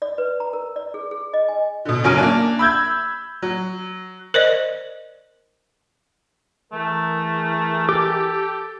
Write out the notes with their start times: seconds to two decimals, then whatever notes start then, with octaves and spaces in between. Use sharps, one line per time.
0.02 D5
0.18 B4
0.40 A#5
0.53 A#4
0.76 D5
0.94 G#4
1.11 G#4
1.33 D#5
1.48 G#5
1.85 B2 D3
2.04 F#1 F#3 C#4 G#5 F6 D7
2.18 A#3 D4
2.59 B5 E6 G6 G#6
3.42 F#3
4.34 A#4 C5 D5 D#5
6.73 E3 A3 G#4 A#4
7.89 G4 A4 D6